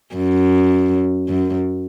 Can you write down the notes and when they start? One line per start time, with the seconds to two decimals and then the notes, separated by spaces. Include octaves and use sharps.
0.15 F#2
1.28 F#2